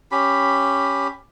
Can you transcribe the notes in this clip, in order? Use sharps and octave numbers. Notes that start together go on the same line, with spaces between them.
C#4 G4 B5